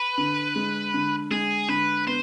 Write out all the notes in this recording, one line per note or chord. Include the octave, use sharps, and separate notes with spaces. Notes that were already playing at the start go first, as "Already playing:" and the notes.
Already playing: B4
D3
G#3
D3
G#3 G#4
D3 B4
B3 C5